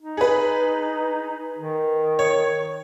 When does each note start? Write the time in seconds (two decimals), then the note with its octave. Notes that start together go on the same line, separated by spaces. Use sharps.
0.02 D#4
0.17 G#4 B4
1.59 D#3
2.19 C#5